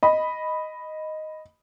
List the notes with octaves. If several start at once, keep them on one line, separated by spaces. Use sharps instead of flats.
D#5 B5